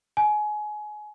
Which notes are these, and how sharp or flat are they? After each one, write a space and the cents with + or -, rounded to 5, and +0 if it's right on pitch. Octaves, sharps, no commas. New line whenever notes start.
G#5 +25